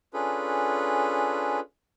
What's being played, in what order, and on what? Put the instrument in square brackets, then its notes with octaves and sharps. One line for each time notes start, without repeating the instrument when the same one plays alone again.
[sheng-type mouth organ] C#4 D4 F4 G#4 A4 B4